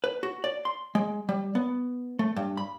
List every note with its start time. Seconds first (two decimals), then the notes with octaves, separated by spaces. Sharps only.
0.04 B4
0.23 F#4
0.44 D5
0.65 C6
0.95 G#3
1.29 G3
1.55 B3
2.19 A3
2.36 G2
2.57 B5